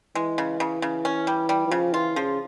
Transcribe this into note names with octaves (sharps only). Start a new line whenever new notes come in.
E3 G#3
C#3
C#3
C#3
C#4
G3
G3
E3
C#3 F3
E3 F4
C#3 F3